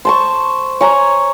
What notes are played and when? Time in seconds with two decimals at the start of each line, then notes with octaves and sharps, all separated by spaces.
0.05 C5 A5 C#6
0.81 C#5 G#5 A#5